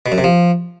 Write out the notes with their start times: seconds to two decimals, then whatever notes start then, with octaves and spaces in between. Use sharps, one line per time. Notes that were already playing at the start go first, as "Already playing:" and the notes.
0.06 B2
0.12 F#2
0.18 C3
0.24 F3